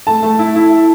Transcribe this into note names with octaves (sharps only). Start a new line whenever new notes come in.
A3 A5
A3
E4
E4